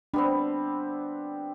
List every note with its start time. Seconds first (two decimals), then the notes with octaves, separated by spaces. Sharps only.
0.14 G3 B3 C4 D4